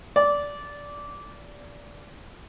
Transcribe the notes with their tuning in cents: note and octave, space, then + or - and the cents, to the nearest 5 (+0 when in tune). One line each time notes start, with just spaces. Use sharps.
D5 -15